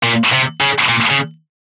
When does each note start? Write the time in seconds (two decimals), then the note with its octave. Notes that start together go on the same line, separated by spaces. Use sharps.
0.03 A#2
0.33 C3
0.61 C#3
0.89 A#2
1.10 C#3